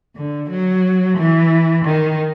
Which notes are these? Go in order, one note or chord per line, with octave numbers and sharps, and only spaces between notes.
D3
F#3
E3
D#3